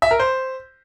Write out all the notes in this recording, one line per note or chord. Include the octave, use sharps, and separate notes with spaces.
E5
A#4
C5